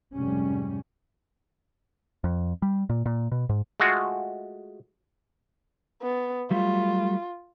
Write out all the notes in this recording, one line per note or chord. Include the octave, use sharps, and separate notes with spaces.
F1 G#2 G3 C#4
F2
G3
A#2
A#2
B2
G#2
G#3 A3 F4 F#4
B3
F#3 G3 A3 F4